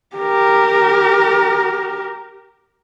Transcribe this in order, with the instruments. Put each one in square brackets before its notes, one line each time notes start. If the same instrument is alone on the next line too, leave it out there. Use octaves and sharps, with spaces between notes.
[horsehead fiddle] G4 A#4